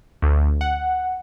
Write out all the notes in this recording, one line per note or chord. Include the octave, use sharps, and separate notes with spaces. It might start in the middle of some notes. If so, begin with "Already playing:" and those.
D2
F#5